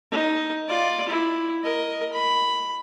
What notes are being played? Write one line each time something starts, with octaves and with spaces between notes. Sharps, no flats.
D#4
F4 D5
E4
A#4 D#5
B5